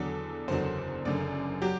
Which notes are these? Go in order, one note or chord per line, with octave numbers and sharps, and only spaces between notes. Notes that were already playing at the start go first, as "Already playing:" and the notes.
Already playing: E2 D3 F#3 A4
F#1 E2 D3 F#3 C5
F#1 F#2 D3 D5
F#3 G4